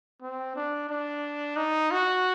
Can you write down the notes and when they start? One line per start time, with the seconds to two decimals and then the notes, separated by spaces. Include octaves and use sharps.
0.22 C4
0.56 D4
0.89 D4
1.57 D#4
1.91 F#4